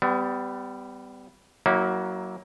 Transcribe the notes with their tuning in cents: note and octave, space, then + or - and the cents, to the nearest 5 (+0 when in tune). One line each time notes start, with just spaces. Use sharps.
G3 +0 B3 +35
F#3 +10 A#3 +10 E4 -35